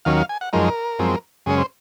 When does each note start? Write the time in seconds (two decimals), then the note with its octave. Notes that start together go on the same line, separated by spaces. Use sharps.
0.05 D#2 D#3 F#3 C#4 F5
0.17 F5
0.29 G#5
0.41 F#5
0.53 F#2 F3 G#3 D#4 A#4
0.99 F#2 F3 G#3 C4
1.46 F#2 C#3 G#3 C#4 G#4
1.58 C5